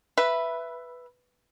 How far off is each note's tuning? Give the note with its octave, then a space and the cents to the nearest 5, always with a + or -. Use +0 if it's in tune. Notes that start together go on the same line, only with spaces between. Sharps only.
B4 +0 E5 +10